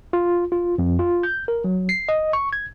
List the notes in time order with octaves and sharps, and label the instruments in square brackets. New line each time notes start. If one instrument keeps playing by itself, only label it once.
[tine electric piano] F4
F4
F2
F4
G6
A#4
F#3
C7
D#5
C#6
G#6